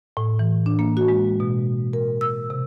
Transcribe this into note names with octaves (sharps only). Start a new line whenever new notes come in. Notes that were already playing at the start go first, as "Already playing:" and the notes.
A2
E3
D4
A#3
F#4
G#3
B2
A#4
E6
C3